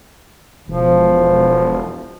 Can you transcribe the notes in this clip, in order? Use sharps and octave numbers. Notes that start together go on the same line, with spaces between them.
E1 F3